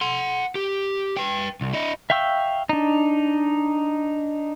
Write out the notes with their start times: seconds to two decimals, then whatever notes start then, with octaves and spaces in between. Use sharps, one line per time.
0.01 F#5 C6
0.55 G4
1.17 B4 G5
1.61 C2
1.73 E4 D#5
2.10 E5 F5 G5 C#6 E6
2.69 D4 D#4